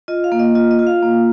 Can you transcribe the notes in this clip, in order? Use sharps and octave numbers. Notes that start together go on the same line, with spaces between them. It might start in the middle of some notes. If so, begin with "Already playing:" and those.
F4 D#5
F5
A#3
D#5
F4 D#5
D#5
F4
F5
A#3